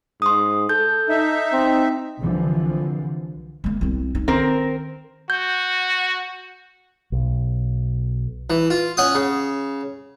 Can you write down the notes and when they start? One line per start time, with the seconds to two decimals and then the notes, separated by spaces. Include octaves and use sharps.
0.22 G#2 C6 D#6
0.69 A4 G6
1.09 D#4 E5
1.53 C4
2.18 C2 D3 E3 F3
3.64 G#3 A#3
3.81 C2 C4
4.15 D#4
4.28 D#3 C4 A#4
5.30 F#4 G6
7.12 B1
8.50 E3
8.70 F4
8.97 C#4 F#5 D#6
9.15 C#3